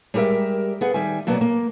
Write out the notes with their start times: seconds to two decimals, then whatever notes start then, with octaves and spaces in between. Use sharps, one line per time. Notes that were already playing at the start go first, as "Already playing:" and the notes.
0.14 G3 G#3 G4 A#4 E5
0.81 B3 G#4 F#5
0.94 D#3 G3 E5 G#5
1.27 B2 F#3 A#3 B3 D4
1.41 A#3